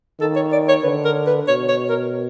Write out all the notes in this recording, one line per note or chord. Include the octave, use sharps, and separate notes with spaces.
D#3 A4
C#5
D5
C#5
D3 B4
A#4
B4
B2 C#5
C#5
A#4